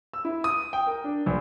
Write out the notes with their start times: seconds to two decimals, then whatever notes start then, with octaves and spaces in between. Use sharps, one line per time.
0.13 E6
0.25 E4
0.44 D#6
0.73 G5
0.87 A#4
1.04 D4
1.26 A#1